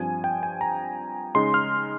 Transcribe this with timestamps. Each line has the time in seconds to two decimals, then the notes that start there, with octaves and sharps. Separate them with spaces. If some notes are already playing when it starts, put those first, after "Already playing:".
Already playing: G2 F3 C4 G#5
0.24 G5
0.43 G#5
0.61 A#5
1.35 C#3 G#3 D#4 C6
1.54 F6